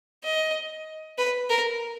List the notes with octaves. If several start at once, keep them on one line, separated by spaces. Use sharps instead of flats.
D#5
B4
A#4